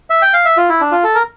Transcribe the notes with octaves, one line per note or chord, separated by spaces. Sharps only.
E5
G5
F5
E5
F4
E4
D4
F4
A4
A#4